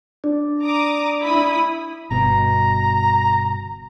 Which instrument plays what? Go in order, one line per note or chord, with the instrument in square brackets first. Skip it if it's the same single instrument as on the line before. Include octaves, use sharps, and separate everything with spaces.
[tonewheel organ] D4
[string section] A#5 D6 D#6
E4 B5 D#6
[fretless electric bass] G1 B2 [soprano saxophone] A#5